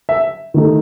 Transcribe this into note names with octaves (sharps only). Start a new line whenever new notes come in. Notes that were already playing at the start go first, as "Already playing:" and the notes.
E5
D#3 A3 D#4